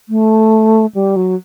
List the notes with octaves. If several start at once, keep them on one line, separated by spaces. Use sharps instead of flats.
A3
G3
F#3